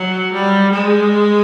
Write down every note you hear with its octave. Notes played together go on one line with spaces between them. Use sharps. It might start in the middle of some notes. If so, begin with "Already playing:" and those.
Already playing: F#3
G3
G#3